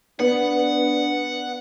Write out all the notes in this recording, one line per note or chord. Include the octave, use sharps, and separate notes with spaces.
B3 D4 F#5